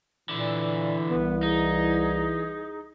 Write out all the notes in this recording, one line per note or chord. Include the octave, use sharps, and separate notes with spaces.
A#2 D3 E3 E4
C2 B3
D#4 G#4